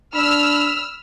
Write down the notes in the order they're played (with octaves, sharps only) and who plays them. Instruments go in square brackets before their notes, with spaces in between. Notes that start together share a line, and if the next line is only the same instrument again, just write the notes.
[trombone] D4 [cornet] B5 [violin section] E6 F6